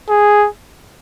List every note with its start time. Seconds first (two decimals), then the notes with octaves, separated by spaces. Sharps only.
0.09 G#4